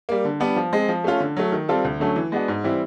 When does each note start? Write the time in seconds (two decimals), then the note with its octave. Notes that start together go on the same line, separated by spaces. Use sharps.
0.09 G3 A#3
0.25 D3
0.40 G3 B3 D4
0.56 F3
0.73 G#3 C4
0.88 F3
1.04 A3 C#4 F4
1.20 D3
1.37 F#3 A3
1.52 D#3
1.69 G3 C4 F4 A4
1.85 D2
2.00 D3 F#3 A3 C#4
2.16 E3
2.32 G#3 B3 D4 F#4
2.48 G#2
2.64 E3 G3 C4 E4